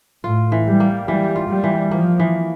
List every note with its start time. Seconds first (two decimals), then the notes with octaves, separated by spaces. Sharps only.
0.24 A2 F4
0.52 E3
0.66 G3
0.80 A#3
1.08 E3 G3
1.36 F4
1.49 G3
1.64 E3
1.91 F3 A#3
2.19 E3